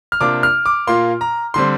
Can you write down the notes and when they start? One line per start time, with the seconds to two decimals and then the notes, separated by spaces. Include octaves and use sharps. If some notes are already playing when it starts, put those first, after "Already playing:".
0.12 F6
0.21 C3 A#3 D4 F4 D6
0.43 F6
0.66 D6
0.87 A#2 A#3 F4 C6
1.21 A#5
1.54 D3 G3 C4 C6